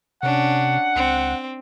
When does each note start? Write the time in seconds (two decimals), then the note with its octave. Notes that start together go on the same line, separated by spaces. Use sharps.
0.23 C3 C#4 D4 F#5
0.96 C#2 C4